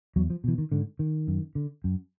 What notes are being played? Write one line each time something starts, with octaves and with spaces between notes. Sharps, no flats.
E2 F#3
F3
B2 E3
D#3
G#2 D3
D#3
F#2
D3
F#2